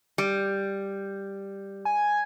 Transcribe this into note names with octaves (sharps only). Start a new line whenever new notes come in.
G3
G#5